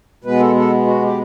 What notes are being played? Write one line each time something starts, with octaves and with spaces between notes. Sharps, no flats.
B2 G#3 B3 B4
A4
A4
F#4
G4